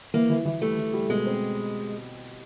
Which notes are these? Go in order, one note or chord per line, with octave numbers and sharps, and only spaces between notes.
E3 A#3
E3
E3
G3 A3
E3
G3
B2 G#3
C4